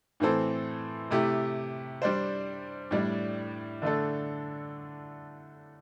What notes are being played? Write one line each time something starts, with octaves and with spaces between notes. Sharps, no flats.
A2 E3 C4 A4 C5
C3 A3 E4 G4
G3 D4 C5
A2 G3 D4
D3 A3 D4 A4